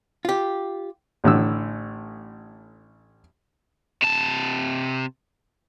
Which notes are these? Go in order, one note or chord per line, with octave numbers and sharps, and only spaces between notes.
F4 G4
A1 A2 D3 E6
C3 A5